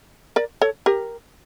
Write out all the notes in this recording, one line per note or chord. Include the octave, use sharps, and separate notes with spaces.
A#4 D5
A4 C#5
G4 A#4